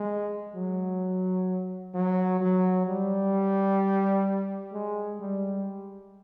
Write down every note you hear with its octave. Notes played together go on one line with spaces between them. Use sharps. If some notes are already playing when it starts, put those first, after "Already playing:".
Already playing: G#3
F#3
F#3
F#3
G3
G#3
G3